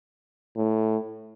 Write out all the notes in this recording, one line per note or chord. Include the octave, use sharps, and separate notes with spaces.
A2